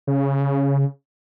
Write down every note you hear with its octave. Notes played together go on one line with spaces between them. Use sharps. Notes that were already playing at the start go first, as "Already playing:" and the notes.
C#3